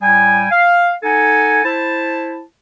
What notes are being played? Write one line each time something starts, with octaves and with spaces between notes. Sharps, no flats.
A2 G3 G5 G#5
F5
D#4 A4 F#5 G#5
E4 C5 A5